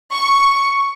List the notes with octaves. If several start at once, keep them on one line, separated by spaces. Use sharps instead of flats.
C#6